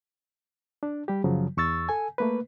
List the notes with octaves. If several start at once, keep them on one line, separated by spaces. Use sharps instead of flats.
D4
G3 G4
F#2 C#3 F3 F#3
E2 C#6 E6 A6
A4 G#5
A3 A#3 B4